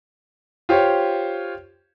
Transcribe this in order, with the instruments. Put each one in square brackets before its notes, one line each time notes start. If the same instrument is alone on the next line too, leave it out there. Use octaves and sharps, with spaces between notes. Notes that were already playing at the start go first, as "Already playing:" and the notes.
[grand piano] F4 G4 C5 C#5